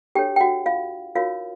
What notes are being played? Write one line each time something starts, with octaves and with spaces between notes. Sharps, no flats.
D4 F#4 G4 A4 C#5 G5
G5
F#4 F#5
F4 F5
D#4 F4 F#4 A#4 C#5 F5